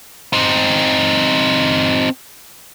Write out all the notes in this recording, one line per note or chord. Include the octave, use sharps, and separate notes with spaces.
C4 D#4